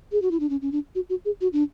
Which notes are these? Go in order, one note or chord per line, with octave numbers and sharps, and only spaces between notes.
G#4
F#4
E4
D4
C#4
C#4
D4
F#4
F#4
G#4
F#4
D4